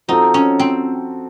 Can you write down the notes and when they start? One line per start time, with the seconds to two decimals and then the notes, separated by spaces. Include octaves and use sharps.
0.08 F3 C4 D#4 F#4 A4
0.34 C#4
0.59 C4